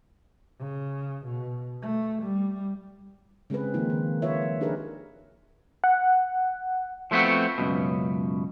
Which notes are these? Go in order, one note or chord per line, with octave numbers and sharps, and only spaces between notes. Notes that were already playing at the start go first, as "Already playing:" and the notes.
C#3
B2
A3
G3
C#3 G#3 C4 G#4 B4
D#3 F3 A#3 D#4 F4
D#3
F4 B4 C#5 E5
F3
D4 D#4 G4 G#4 A#4 B4
F#5
F3 A3 B3 C4 F#4
C#2 F#2 B2